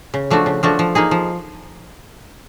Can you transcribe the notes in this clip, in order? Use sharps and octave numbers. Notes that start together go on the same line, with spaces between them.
C#3
F3 A3 D4 F#4
C#3
F3 A3 D4 F#4
F3
A#3 D#4 G#4
F3